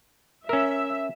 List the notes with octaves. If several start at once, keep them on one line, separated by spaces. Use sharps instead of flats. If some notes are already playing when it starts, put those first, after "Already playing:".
C#4 A#4 E5